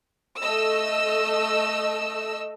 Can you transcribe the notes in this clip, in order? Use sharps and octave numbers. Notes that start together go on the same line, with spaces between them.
A3 D#5 E6